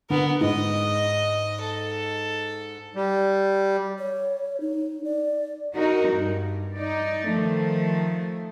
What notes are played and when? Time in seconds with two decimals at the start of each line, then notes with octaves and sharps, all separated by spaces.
0.10 D3 B3 A#4
0.41 G#2 D#5
1.61 A4
2.96 G3
3.99 C#5
4.61 D#4
5.04 D5
5.75 D#4 F#4 A#4
6.11 G2
6.77 D#4 D5
7.28 D#3 F3 A3